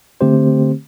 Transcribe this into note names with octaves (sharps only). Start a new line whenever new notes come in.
D3 A3 C4 G4 C5